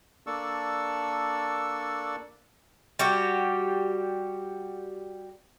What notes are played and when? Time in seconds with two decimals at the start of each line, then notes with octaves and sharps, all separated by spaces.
0.27 A#3 D4 A4 D5 C#6 E6
2.99 G3 F#4 G4